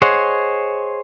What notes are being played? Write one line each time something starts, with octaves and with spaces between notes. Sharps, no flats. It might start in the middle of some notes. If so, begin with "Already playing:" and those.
G#4 C5 C#5 D#5 F#5